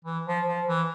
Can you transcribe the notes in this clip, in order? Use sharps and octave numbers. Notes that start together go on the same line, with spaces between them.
E3
F3
F3
E3